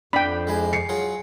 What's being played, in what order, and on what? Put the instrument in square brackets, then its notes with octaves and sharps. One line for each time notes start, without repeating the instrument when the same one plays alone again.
[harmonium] F2 [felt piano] D4 [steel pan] G5 B5
[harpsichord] G#3 E4 G#5
[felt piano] C7 C#7
[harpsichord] F#3 F4 G#4